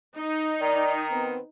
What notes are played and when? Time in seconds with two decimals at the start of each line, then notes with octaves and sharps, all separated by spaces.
0.15 D#4
0.61 D#3 D5 A#5
1.12 B3 C4 B4